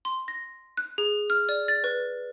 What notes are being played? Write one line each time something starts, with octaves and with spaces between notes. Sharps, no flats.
C6
A#6
F#6
G#4
F6
D5
A6
B4